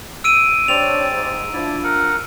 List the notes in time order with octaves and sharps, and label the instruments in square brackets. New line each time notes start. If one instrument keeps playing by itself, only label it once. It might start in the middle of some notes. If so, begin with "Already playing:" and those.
[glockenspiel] E6 D7 D#7
[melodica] C4 G4 D5 [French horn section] D4 C#5 [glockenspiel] F7
[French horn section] G#2
[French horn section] F3 D4 [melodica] E4 D5
[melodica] A#4 F#5